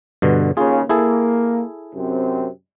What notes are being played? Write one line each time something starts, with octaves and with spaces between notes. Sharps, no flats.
G2 B2 D3
D#2 C#3 F4 G#4
A#3 E4 G#4 A4
F#2 C3 C4